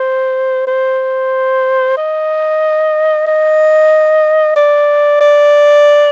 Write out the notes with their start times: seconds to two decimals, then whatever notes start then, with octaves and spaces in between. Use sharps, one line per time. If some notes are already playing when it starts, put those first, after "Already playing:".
Already playing: C5
0.67 C5
1.97 D#5
3.27 D#5
4.56 D5
5.21 D5